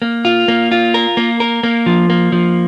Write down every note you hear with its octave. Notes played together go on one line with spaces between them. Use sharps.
A#3
F4
A#3
F4
A#4
A#3
A#4
A#3
F3
A#3
F3